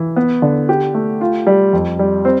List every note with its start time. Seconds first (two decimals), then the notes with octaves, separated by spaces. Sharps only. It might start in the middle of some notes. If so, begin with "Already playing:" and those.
Already playing: E3
0.16 B3
0.42 D3
0.69 G4
0.94 A3
1.21 F4
1.47 G3
1.73 F2
1.99 G3
2.25 C4